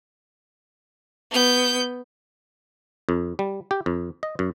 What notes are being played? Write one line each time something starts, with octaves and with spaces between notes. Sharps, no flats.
B3 G6
F2
G3
G4
F2
D#5
F#2